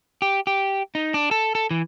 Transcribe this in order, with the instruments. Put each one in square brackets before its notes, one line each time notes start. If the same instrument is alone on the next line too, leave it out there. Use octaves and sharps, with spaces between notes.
[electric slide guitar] G4
G4
D#4
D4
A4
A4
E3